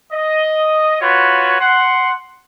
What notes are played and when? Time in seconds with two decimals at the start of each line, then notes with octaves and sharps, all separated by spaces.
0.13 D#5
1.01 F4 F#4 B4 C#5
1.61 F#5 C6